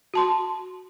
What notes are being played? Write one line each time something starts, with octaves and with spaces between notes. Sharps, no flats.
F#4 A5 C6